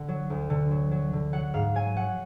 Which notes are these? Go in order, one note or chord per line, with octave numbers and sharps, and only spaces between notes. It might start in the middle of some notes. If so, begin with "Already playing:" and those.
Already playing: D3 F#5
F#3
D2
D3
F#3
F#3
D3
F#3 F#5
G#2 F5
F#3 G#5
F#3 F#5